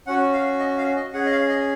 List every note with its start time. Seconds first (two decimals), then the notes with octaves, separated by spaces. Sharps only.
0.07 C#4 F#4 F#5
0.34 F5
0.60 D#5
0.78 F5
0.96 D#5
1.13 C#4 G#4 F#5
1.26 D#5
1.31 F5
1.49 D#5